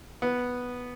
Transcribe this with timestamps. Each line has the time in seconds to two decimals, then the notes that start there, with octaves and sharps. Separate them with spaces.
0.22 B3